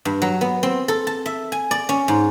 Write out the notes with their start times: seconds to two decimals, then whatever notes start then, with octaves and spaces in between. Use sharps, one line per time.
0.05 G2
0.22 F#3
0.41 B3
0.63 C4
0.88 A4
1.07 A5
1.26 E5
1.52 G#5
1.71 D5
1.89 C#4
2.08 G#2